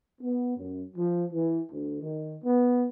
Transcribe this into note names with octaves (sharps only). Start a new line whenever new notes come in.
B3
F#2
F3
E3
D2
D#3
B3